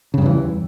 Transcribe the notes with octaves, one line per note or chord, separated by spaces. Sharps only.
E2 G2 C#3 E3